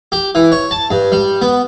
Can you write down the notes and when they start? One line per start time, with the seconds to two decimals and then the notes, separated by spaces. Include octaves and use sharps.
0.12 G4
0.35 E3
0.52 C#5
0.71 A5
0.91 G2
1.12 G3
1.41 B3